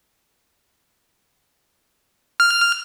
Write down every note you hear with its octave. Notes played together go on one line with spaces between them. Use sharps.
F6